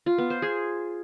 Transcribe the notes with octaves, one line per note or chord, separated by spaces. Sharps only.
F4
B3
C5
G#4